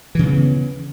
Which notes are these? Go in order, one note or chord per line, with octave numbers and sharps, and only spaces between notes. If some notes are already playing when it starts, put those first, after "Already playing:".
C#3 E3 A#3 B3